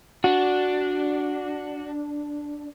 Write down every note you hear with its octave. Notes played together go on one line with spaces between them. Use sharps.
D4 F#4